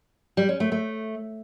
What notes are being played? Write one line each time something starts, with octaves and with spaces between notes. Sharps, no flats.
G3
C#4
A3
A3